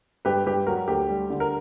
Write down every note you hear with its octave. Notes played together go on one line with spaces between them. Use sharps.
G2 G4 B4
G2 G4 B4
F#3 F#4 A#4
D2 G4
G3
D3
A#4